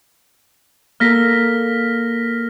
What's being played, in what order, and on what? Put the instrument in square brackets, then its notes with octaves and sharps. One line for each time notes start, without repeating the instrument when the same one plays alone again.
[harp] A#3 A4 A#4 [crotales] F6 A#6 B6